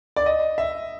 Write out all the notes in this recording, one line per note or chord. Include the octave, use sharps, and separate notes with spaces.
D5
D#5
E5